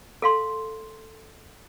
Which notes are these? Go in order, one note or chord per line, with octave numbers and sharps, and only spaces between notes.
A4 F5 C6